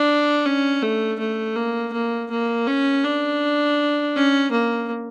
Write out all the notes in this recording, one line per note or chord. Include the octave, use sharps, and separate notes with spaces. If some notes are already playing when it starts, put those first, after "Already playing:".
Already playing: D4
C#4
A3
A3
A#3
A#3
A#3
C#4
D4
C#4
A#3